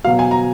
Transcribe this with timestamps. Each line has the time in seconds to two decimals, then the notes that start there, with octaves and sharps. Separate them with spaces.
0.05 B2 F#3 F5
0.19 G#5
0.31 A#5